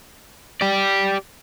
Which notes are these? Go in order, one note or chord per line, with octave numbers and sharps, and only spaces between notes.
G4 D5